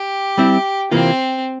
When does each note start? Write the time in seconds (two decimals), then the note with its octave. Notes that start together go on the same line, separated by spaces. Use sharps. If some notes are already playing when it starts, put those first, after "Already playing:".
Already playing: G4
0.38 G3 C4 E4
0.91 C3 E3 A#3 C4 F4